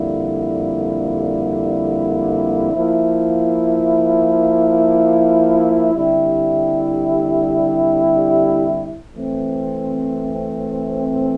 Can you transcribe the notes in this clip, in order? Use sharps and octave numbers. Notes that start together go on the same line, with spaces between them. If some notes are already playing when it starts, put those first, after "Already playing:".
Already playing: F2 D3 G3 A#3 E4
F3 A#3 E4
D3 G3 C4 E4 G4
E3 A3 C4